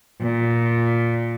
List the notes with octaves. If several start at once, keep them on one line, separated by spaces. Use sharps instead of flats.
A#2